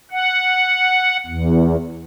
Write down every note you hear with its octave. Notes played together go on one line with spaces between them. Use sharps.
F#5
E2